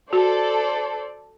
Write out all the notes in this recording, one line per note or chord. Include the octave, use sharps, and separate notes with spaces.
F#4 A4 C5 D5